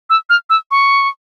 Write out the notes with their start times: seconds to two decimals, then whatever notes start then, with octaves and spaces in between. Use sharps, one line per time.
0.10 E6
0.30 F6
0.50 E6
0.71 C#6